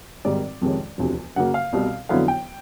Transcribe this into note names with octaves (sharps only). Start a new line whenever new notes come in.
G#1 G#2 D#3 G3 D5
F2 C3 D#3 G#3 C#4
E1 D2 C3 F3
F#2 C#3 F#3 A#3 F#5
F5
C2 B2 G3
F2 D3 F#3 B3 E4 F5
G5